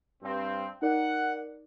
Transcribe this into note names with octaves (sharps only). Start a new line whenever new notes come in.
G2 C4
D#4 A#4 D5 F#5